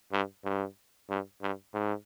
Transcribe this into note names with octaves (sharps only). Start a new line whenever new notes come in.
G2
G2
G2
G2
G#2